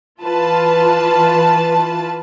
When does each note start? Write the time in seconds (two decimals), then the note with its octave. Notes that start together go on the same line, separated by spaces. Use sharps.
0.22 E3 F4 B4 A5